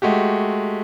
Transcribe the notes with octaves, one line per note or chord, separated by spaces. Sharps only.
G#3 A3 F#4 G4